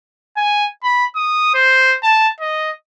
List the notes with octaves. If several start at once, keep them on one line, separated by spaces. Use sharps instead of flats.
G#5
B5
D#6
C5
A5
D#5